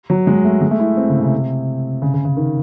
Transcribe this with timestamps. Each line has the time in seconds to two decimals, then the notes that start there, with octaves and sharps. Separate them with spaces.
0.10 F#3
0.27 G#3
0.45 A3
0.61 G#3
0.71 A3
0.79 E4
0.97 C4
1.09 C#3
1.20 C3
2.02 C#3
2.14 C#3
2.25 C#3
2.37 D#3